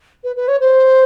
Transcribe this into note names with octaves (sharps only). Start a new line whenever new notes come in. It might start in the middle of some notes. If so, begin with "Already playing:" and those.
B4
B4
C#5
C5